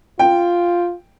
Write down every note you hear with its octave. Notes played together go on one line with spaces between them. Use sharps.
F4 G5